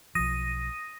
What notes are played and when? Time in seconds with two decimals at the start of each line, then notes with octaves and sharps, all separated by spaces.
0.15 B1 F3 D#6 A#6 D#7